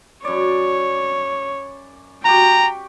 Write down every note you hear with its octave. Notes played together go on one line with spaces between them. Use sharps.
F#2 C#5 D5
F#4 G4 G5 A#5